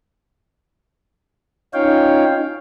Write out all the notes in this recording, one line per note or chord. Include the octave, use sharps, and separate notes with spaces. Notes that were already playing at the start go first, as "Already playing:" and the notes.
C#4 D#4 F4 C#5 F5 G5